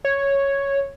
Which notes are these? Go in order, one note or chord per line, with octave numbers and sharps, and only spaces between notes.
C#5